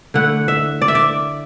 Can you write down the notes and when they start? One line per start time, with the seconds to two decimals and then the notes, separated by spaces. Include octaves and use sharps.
0.14 D3 A3 E4 F#5
0.48 E5
0.81 D5
0.88 E5
0.95 D5